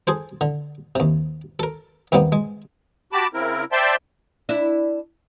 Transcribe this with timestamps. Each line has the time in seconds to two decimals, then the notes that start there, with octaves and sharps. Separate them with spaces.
0.07 G#4 A4 C5
0.41 D3
0.95 D#2 C3
1.59 A4 A#4
2.12 D#2 C3 G3 A#3 B3
2.32 G#3
3.13 F#4 G4 A5 B5 D6
3.33 C#3 C4 E4 A#4
3.72 C5 D5 E5 G5 A5 C6
4.49 D4 E4